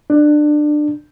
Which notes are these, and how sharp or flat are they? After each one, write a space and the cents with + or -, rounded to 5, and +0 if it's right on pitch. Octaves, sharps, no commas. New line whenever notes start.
D4 +20